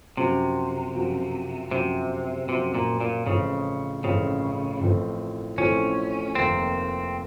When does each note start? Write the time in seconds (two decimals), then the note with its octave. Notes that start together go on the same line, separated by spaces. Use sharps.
0.17 F#2 C3 F3 C4 F#4
0.94 F#2 F3 C4 F#4
1.71 F#2 C3 F3 C4 F#4
2.49 F#2 C3 F3 C4 F#4
2.75 A#2
3.01 A#2
3.26 A1 A2 C#3 F3 C4
4.03 A1 A2 C#3 F3 C4
4.81 A1 A2 F3 C4
5.58 A1 A2 F3 C4 C#4
6.35 F1 D#2 D#3 A#3 C4 D#4